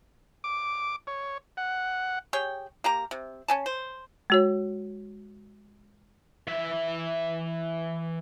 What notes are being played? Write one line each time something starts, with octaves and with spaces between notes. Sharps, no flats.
D6
C#5
F#5
G4 G#4 C#5 G5
A#3 G4 A#5
C3
C#4 G#5 A5
C5
G#3 F#4 C#5
E3 E5